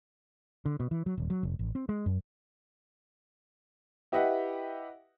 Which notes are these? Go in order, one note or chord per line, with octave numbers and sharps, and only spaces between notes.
D3
B2
E3
F#3
D#1
F#3
F1
A1
C4
G#3
F#2
E4 G4 B4 D#5 E5 F#5